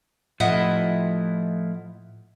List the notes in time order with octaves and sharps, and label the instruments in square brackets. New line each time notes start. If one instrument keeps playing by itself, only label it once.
[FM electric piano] A2 [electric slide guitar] F3 A3 [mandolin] E4 D#5 F#5